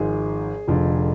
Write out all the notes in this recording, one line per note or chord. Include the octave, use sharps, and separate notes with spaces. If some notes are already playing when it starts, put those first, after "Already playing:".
Already playing: G#1 G#2 F3 G#4
F1 F2 D3 F3